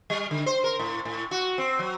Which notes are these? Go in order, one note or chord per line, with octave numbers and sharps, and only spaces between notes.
G3
D3
C5
A#4
A2
A2
F#4
C4
F#3